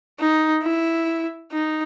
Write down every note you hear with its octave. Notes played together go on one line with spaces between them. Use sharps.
D#4
E4
D#4